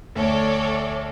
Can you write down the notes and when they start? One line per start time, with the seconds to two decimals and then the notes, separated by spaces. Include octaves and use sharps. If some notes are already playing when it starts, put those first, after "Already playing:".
0.15 D2 A4 C#5 D5